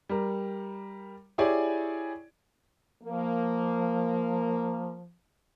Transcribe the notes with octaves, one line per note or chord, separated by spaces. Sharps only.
G3 A#4
E4 G4 G#4 C#5 D5 G#5
F3 A#3